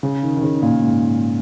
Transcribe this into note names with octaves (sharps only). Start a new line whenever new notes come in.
C#3
D#3
D#3
C#3
A#2
G#2